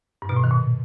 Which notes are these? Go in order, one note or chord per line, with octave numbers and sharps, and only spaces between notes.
G2
B2
A2
D#3
A#2